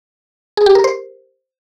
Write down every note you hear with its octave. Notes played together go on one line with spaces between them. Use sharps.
G#4
G4
A#4
C5